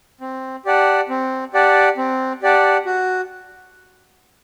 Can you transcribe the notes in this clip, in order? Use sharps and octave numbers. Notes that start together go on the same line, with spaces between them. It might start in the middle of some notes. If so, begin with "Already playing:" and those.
C4
G4 D5 F#5 A5
C4
G4 D5 F#5 A5
C4
G4 D5 F#5 A5
F#4